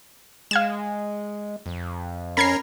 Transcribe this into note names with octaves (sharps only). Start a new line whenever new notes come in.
G#3 F5 G#6 E7
F2
C#4 A#4 A#5 B5 G#6 C7